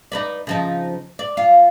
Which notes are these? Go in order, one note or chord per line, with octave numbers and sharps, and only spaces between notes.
D#4 B4 D5
C#3 F3 D#4
D5
F4